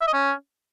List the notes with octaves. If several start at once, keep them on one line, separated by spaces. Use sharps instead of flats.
E5
D#5
C#4